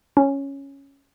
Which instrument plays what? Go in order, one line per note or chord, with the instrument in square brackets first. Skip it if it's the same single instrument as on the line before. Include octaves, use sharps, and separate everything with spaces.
[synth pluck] C#4